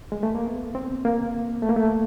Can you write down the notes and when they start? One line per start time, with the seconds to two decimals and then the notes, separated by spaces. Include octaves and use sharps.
0.12 G#3
0.23 A3
0.35 A#3
0.47 B3
0.75 C4
1.05 A#3
1.62 A3
1.69 A#3
1.76 A3